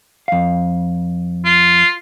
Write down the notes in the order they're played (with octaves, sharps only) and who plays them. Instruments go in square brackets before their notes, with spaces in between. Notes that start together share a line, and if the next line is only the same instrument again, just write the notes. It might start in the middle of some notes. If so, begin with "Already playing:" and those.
[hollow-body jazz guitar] F2 F5
[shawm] F4